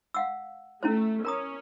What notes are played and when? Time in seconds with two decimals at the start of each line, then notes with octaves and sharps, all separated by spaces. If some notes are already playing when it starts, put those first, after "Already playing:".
0.14 F5 F#5 E6
0.83 A3 C#4 E4 C5
1.25 C#4 A#4 A#5 D#6